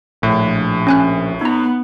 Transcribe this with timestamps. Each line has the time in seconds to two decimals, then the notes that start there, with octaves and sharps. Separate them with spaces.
0.23 A#1 A2
0.87 C#4 G#5 F#6
1.41 B3 D#4 A#5